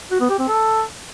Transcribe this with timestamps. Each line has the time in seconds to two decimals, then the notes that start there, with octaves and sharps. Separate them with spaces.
0.11 F#4
0.20 B3
0.30 G4
0.39 C4
0.48 A4